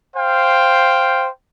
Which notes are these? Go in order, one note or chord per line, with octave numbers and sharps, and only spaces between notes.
C5 F5 G5